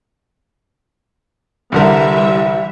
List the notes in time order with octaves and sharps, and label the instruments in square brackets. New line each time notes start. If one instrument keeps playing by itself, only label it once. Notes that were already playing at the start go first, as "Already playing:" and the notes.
[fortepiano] C2 D3 A#4 [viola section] E3 G3 E5